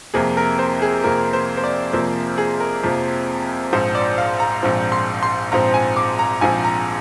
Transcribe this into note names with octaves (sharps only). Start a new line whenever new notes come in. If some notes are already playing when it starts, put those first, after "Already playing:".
F2 C3 F3 A#3 G#4
A#4
C5
G#4
F2 C3 F3 A#3 A#4
C5
C5
D5
F2 C3 F3 A#3 C5
G#4
A#4
F2 C3 F3 A#3
A#1 G#2 F3 C4 C5
D5
F5
A#5
A#1 G#2 F3 C4
C6
C6
A#1 G#2 F3 C4 A#5
G#5
D6
A#5
A#1 G#2 F3 C4 G#5
A#5